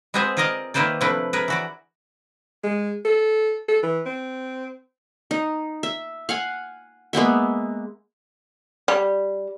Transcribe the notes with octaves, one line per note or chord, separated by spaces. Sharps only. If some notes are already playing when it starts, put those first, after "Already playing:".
G#3 B3 C4 G#4 B4 C5
F4 G#4 A#4 D5 D#5 F5
D#3 A#3 E4 B4 C5 D5
C3 F3 A3 D4 E4 B4
G#4 A#4 B4
E3 F#4 D5
G#3
A4
A4
E3
C4
D#4
E5
F5 F#5 G#5
G#3 A#3 B3 E5
G3